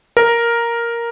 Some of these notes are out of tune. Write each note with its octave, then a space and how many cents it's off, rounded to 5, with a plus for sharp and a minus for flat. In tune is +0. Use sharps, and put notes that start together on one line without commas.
A#4 +5